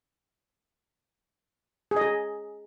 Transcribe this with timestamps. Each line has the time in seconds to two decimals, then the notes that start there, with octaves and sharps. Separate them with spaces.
1.91 G#4
1.96 D#5
2.02 G#4